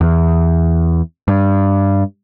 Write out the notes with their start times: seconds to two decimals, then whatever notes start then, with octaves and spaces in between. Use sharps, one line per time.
0.01 E2
1.28 G2